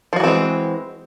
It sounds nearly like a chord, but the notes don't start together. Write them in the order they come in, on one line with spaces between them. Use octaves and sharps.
F3 F#4 E3 C4 G#3